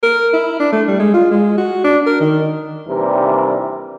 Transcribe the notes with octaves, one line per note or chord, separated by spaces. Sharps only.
A#4
E4
D4
A3
G3
G#3
F4
G#3
F#4
D4
A#4
D#3
D#2 C3 E3 G3 D4 A#4